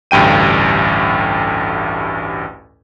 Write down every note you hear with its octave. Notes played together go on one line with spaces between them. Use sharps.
A1 D2 G2 G5 D#7